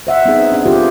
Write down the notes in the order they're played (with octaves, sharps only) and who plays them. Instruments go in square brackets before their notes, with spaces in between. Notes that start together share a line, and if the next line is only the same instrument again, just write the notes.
[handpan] C5 E5 F#5
B3 C4 D#4 G#4
D4 G#4 E5
F4 G4 A4 C5